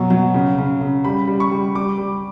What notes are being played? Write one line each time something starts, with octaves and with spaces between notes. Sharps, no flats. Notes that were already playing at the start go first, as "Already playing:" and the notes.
Already playing: B2 F#3
F#3
C#3
C#3
C#3
G3 B5
G3
C#6
G3
G3 D6
G3